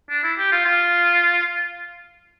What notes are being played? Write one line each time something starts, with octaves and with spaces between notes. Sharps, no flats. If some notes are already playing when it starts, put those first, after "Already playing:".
D4
E4
G4
F4
F4